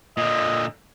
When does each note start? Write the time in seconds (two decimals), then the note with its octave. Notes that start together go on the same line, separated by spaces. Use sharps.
0.17 A#2 D3 D#5